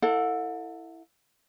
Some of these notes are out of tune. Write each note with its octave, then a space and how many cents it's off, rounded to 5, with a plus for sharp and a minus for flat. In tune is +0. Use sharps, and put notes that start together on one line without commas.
E4 +0 A4 +30 F#5 -35